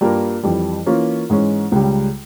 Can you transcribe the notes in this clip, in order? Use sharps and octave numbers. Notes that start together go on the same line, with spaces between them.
G2 G3 A#3 F4 A#4
F2 E3 G3
E3 A#3 C#4 F4
G#2 E3 G#3 C#4
C#2 C#3 G3